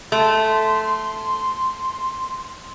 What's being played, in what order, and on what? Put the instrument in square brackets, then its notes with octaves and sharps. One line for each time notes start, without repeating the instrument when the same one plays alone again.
[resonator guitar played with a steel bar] A3 [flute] C6